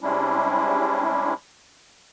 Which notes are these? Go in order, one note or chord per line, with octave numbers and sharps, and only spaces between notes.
C3 G3 G#3 C#4 D4 E4